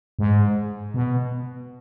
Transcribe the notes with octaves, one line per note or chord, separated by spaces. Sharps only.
G#2
B2